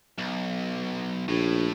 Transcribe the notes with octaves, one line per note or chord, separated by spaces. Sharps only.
B1
A#1 A2